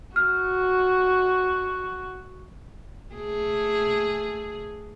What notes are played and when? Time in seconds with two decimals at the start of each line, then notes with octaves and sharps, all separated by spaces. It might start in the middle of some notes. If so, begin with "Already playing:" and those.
0.16 F#4 F6
3.14 A3 G#4